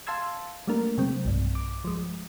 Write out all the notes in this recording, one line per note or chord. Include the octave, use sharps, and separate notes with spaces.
F5 A5 C6 E6 G#6
G3 A3 A#3 D4 A#4
C3 F#3 G#3 C4
B1 G2
D6
F3 G#3